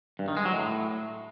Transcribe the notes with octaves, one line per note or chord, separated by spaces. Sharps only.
G2
D#3
G#3
F#3
A2